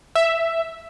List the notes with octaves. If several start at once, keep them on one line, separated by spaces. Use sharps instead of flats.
E5